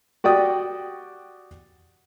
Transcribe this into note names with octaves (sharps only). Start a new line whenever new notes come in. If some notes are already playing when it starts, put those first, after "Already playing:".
F#4 G4 D5 G5 D#6